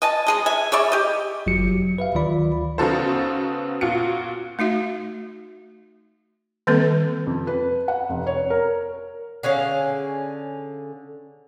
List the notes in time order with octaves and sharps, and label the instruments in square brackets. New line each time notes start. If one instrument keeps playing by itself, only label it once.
[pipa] D#5 G#5 A5
G#3 G#4 D#5
E5 G#5
G#4 C#5 D5 E5
G4 D#5
[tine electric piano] G1 F#2 F#3 F#4 G4 C#7
F#3
B4 E5 F5
D2 D#3 F#3 F4 D5 B5
[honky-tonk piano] C#3 B3 D#4 F#4 A4 C5
A#2 F4 F#4 C#7
[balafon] A3 D#4 F#4 E5
D#3 G3 A#3 C4 A4 B4
[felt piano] F2
B4
F#5
F1
C#5
A#4
[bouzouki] D3 C#4 G#4 F5